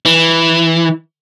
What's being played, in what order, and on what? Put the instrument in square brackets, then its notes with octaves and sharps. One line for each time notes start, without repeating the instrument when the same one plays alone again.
[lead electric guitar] E3